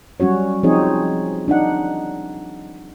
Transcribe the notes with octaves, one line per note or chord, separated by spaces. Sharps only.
F#3 G3 C#4 F#4 C#5
F3 C4 D#4 G#4 C#5
D4 D#4 F#5